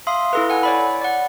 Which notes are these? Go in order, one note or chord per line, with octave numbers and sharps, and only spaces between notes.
E5 F5 C6 D#6
E4 A4 B4
A4 F#5 G#5
C#5 D5 B5
D5 F#5